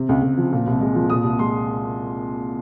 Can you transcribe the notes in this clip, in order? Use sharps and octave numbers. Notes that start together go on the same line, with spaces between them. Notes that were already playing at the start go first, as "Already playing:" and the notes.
Already playing: C3
C#2
C#2
F3
A#2
C2
G#3
F3
A#2 D#6
C2
G#3 C6